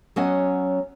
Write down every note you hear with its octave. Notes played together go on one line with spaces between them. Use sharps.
F#3 B3 C#4 D#5 F#5 G#5